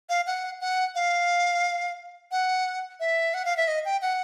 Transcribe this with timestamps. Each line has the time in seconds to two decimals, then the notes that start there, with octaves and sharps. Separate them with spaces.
0.09 F5
0.27 F#5
0.61 F#5
0.95 F5
2.32 F#5
3.00 E5
3.34 F#5
3.45 F5
3.57 E5
3.68 D#5
3.85 G5
4.02 F#5